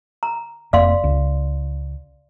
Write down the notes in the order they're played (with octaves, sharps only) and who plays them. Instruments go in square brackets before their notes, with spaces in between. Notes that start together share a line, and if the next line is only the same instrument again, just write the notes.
[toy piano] A#5
[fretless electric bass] F1 F2 A#3 [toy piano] D5 F5 C6
[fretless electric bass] C#2